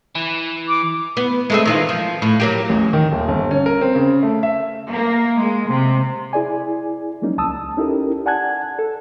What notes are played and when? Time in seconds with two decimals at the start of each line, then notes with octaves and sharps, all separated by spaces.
0.15 E3
0.69 D6
1.17 B3
1.50 G#3 A3 C4
1.65 D#3 E3 F4
1.89 F3
2.22 A2
2.40 F#3 A#3 G4
2.69 A1
2.93 D#3
3.12 D#1
3.28 G1
3.51 C#4
3.66 A#4
3.81 C4
3.95 C#3
4.23 A3
4.43 E5
4.91 A#3
5.38 G#3
5.70 C3
6.33 E4 G#4 D5 G#5
7.22 F3 F#3 G#3 A#3 C#4 D#4
7.38 C#2 A5 D#6 E6
7.77 C#4 D#4 E4 G4 A4 A#4
8.26 D5 F#5 G#5 A5 F#6 G#6
8.79 A4